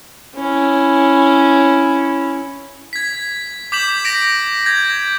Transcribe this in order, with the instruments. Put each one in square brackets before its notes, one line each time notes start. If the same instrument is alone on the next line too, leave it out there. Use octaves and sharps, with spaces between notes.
[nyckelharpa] C#4 E4
[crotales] G#6 B6
D6 G6 B6 E7 F#7
D6 A#6 D7
G6 G#6 A#6